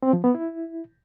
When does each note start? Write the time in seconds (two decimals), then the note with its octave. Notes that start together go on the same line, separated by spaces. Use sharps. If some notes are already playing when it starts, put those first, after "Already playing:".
0.03 C4
0.13 F3
0.24 B3
0.35 E4